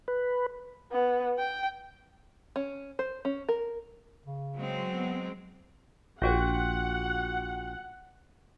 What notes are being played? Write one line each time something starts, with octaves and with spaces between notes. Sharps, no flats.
B4
B3
G5
C#4
C5
C#4
A#4
C#3
F#3 G#3 C4
B3
A#1 F4 F#4 F#5 G5